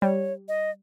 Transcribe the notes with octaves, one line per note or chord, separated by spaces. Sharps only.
G3 C#5
D#5